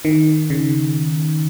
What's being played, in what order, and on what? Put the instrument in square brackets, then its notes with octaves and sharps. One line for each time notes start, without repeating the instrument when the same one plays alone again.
[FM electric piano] D#3
C#3